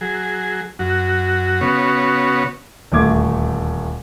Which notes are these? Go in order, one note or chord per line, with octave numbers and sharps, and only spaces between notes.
F#3 G#4
F#2 F#4
C#3 B3 F#4 C#5
D#1 D2 A3 D6 G#6